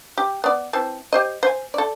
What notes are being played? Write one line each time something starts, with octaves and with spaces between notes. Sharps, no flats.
G4
B3 D5
E3 C4 A5
G4 C5 D#5
C5 G#5
A4 D5